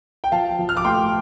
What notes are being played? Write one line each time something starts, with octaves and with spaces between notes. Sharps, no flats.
G5
F3 F5 A5
F3
F6
D6
A3 G5 C6